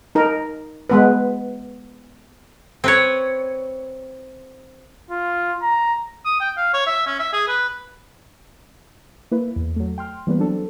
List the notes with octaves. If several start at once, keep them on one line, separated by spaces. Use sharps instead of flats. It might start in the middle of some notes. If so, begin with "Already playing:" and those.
D#4 A#4
G#3 B3 B4
C4 B4 C#5
F4
A#5
D#6
G5
F5
C#5
E5
C#4
E5
G#4
B4
A#3 E4 B4
E2
F#3 A3
G5 C6 F6
E3 G3 A#3 B3 B4
F#3 C4 D4 A4